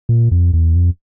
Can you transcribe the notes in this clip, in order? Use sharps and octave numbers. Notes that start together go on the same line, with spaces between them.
A#2
F2
E2
F2